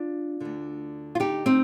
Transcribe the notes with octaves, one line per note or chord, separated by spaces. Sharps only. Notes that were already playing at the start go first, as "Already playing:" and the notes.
Already playing: D4 F4
D2 D3
F4
D#4 G4
C4 D#4